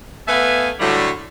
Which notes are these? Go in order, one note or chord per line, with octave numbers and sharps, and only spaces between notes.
A3 B3 B4 E5 F5 G#5
A2 D3 F#3 G3 A3